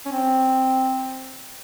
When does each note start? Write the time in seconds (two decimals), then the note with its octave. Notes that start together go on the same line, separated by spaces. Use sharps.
0.06 C#4
0.12 C4